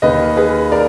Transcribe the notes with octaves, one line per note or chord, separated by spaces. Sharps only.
D#2 D#3 A#3 B4 D#5
G#4 B4
A#4 D5